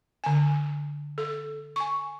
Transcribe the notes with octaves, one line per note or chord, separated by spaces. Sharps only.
D3 G#5
A4
G#5 C#6